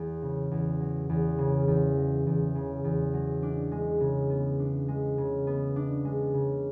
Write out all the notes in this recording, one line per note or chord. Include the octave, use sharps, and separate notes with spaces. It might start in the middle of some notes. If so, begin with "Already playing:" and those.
Already playing: E2
C#3
E2
F#3
E2
C#3
E2
F#3
E2
C#3
E2
F#3
D4
G#3
C#3
B3
D4
G#3
C#3
B3
D4
G#3
C#3